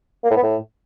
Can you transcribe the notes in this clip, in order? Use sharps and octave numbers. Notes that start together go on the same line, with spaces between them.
A#3
A2
B3
A2